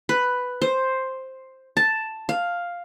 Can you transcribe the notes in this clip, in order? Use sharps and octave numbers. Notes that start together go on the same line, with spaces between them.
B4
C5
A5
F5